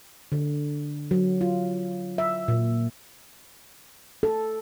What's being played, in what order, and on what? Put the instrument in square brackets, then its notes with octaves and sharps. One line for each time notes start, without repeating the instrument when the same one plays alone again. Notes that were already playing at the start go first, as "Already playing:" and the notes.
[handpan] D3
F#3
F4
E5
A#2
A4